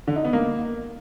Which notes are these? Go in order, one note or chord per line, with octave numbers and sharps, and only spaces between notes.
D3
D#4
B3
A#3